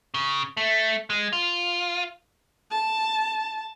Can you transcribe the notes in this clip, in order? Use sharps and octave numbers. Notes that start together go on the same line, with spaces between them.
C#3
A3
G#3
F4
A5